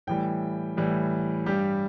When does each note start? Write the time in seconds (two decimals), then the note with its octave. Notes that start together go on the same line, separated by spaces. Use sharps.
0.07 A2 E3 G3 G5
0.77 A2 E3 G3
1.46 G2 G3 G4